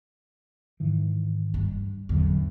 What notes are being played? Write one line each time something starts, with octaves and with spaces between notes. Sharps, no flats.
G#2 D#3 E3
G2
A1 E2 D3 F#3